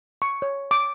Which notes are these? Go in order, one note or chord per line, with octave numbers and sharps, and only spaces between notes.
C#6
C#5
D6